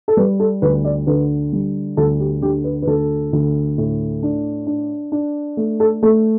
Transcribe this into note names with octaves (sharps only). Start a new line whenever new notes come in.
A4
G3 B4
A4
D2 B4
D5
D3 B4
G3
D2 A4
G4
D3 G4
B4
B4
D2 A4
D2
A2
D4
D4
D4
A3
A4
A3 A4